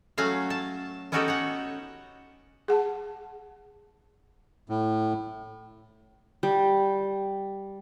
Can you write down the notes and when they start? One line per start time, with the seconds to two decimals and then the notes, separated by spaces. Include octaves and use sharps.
0.18 F#3 A3 C#4 F#4 F5
0.50 A5
1.12 B3 C#4 D#4 F#4 G4 A4
1.28 C#5 F#5
2.68 G#4 F#5 A5
4.70 A2
6.43 G3